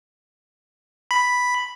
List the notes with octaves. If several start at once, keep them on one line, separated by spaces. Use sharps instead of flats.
B5